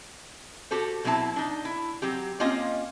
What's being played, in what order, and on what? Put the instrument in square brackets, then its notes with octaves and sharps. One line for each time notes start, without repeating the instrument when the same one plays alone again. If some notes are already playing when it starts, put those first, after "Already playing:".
[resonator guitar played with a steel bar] F#4 G4 A4 C5
B2 F#3 C4 E4 A5
D4 D#4
E4
F#3 C4 G4
A#3 C4 C#4 F4 D#5